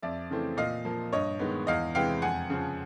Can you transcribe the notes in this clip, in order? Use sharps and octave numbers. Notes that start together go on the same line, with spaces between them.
F2 D5 E5
C#3 E3 A3 C4
A#2 D#5 F5
F3 A#3
G2 C#5 D#5
D#3 G#3 B3
E2 D#5 F5
C3 E3 G#3 B3 F5 G5
F2 F#5 G#5
C#3 F3